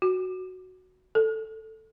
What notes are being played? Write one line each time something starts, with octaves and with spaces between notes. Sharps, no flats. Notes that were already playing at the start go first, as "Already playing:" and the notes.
F#4
A4